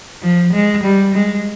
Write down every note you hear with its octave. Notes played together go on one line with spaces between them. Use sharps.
F3
G#3
G3
G#3